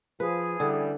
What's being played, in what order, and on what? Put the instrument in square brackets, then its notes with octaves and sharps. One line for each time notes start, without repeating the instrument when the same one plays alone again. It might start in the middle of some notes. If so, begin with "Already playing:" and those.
[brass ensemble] F3 [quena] G#4 [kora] B4
[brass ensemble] A1 E3 G3 [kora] D3